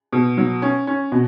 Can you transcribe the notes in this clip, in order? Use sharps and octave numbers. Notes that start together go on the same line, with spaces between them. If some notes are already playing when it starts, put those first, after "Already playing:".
B2
F#3
C#4
C#4
B2